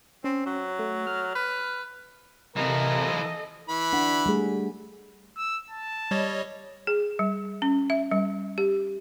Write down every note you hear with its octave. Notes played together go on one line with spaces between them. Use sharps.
C4 C#4
F#3
A3
F6
B4
C3 E3 F4 A4 A#4 D#5
E3 B5
D4 F#5
G3 A3 G#4
E6
A5
G3 C#5 D#5
G#4
G3
C#4
E5
G3
G4